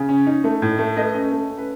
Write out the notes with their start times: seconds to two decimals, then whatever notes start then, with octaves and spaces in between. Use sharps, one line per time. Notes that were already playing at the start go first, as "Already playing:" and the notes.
Already playing: C#3
0.09 C#4
0.26 D#4
0.44 A3
0.62 A2
0.79 A3
0.96 A3 B4 D#5
1.14 C#4
1.31 A3
1.49 C#4
1.58 B4